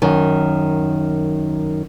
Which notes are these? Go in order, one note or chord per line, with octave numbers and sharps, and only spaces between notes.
F#2 D#3